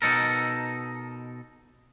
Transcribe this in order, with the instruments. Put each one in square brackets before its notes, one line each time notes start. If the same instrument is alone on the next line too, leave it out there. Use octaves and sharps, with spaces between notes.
[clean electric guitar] B2 D#4 A4 A#4